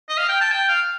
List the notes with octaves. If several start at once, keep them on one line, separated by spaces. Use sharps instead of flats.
D#5
F5
G5
A5
G5
F5